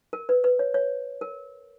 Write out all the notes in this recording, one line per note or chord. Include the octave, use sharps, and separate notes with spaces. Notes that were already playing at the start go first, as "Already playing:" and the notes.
A#4
B4
B4
C#5
C#5
A#4